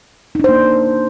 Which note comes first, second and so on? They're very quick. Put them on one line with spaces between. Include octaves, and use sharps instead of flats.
D#4 D4 C5 A#3